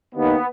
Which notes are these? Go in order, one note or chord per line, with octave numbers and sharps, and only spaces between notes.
D#2 D#3 B3